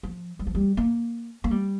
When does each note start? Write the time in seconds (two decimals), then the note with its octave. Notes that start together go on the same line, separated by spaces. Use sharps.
0.03 F3
0.39 G3
0.47 F3
0.55 G3
0.77 A#3
1.44 A#3
1.51 G3